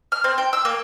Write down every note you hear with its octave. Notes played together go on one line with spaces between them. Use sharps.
F6
C4
G5
E6
A#3